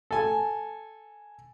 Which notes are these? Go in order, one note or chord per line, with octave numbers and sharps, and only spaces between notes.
A4 G#5